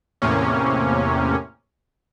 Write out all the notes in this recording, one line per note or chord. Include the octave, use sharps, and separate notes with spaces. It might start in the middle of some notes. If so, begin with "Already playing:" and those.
E2 A2 C3 A#3 C#4